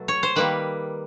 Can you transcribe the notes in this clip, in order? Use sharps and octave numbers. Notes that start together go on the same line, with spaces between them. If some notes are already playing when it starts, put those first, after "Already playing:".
Already playing: B2 F#3 A3
C#5
C5
D#3 G3 A#3 B4